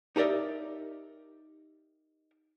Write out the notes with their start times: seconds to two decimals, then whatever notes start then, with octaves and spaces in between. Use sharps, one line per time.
0.16 D#4 G4 A#4 D5 E5